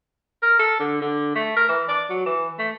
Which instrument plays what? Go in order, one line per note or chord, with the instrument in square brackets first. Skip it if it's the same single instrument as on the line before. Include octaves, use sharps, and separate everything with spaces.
[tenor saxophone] A#4
A4
D3
D3
A3
A#4
E3
D5
F#3
E3
A3